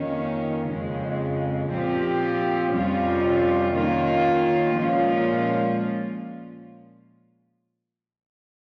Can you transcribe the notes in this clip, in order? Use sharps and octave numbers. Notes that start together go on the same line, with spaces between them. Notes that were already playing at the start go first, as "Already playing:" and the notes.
Already playing: F2 D#3 A#3 C#4
F2 C#3 G#3
A#2 F3 C4 G4
F2 C3 G3 C#4 F4
D#3 A#3 C#4 F4
A#2 F3 G#3 C#4 F4